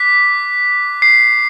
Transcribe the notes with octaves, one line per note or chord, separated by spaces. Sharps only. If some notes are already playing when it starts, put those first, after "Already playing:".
Already playing: D6 F#6 B6
C7